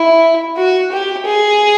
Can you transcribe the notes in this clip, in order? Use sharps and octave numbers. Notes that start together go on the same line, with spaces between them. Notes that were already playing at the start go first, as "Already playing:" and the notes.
Already playing: E4
F#4
G4
G#4